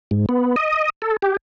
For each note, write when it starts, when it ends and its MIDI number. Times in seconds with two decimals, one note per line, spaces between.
0.11 0.26 44
0.29 0.56 59
0.56 0.90 75
1.02 1.17 69
1.22 1.37 67